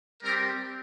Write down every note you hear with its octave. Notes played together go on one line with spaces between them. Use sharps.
G3 C4 G4 A#4